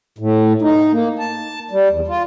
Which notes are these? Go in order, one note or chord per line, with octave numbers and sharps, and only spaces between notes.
A2
D#4
A#3
A5
G3
E2
F4